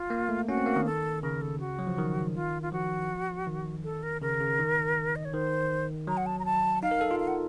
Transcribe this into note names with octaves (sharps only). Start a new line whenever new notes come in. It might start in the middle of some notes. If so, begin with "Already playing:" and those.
Already playing: F4
A#3
A3
C#4 F#4
C4
A#3
D#3
A4
C#3 A#4
A4
F#4
F#3
F3
D#3
F4
F4
F3 F#4
D#3
A4
A#4
C#3 A#4
C#3
D#3
D#5
C#5
D#3 C5
F#3 A#5
F#5
A5
A#5
A5
D#4 F5
A#4
A4
F4
F5
F#5